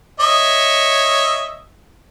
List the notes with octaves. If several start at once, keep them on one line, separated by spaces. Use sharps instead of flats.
C#5 D#5 E5